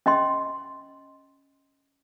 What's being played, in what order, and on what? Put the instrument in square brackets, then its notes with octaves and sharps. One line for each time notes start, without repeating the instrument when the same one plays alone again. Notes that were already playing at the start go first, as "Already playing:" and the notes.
[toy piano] C#4 D#5 G5 C6